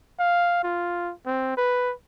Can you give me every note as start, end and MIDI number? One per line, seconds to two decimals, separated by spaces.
0.19 0.62 77
0.64 1.12 65
1.26 1.53 60
1.57 1.93 71